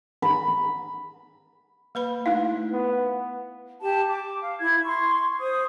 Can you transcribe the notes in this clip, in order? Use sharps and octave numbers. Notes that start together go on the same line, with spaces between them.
B5
A#3 B4 B5
A3 D#4 E4 F5
B3
G4 A5
D6
F5
E4 G#6
C6 C#6
C5 D#6